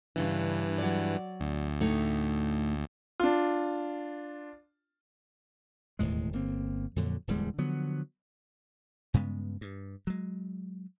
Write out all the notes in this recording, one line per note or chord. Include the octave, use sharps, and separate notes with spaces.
G2 C#3 E3 D4
F#3 D5
D2
A2 A3 D#4
D4 F4
E1 D#2 A2 G#3
G1 A#3 C4
F2 A#2 D3 F#3
D1 E2 G3 G#3
D3 F3 F#3 B3
G2 C#3 G#3 B3
G2
F#3 G#3